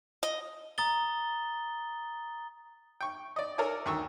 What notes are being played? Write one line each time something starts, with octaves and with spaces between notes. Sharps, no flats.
D#5
A#5 D#6 A6 G7
G5 C#6
D5 D#5
A4 A#4 C#5 D5 G#5
D2 D#3 C#6 E6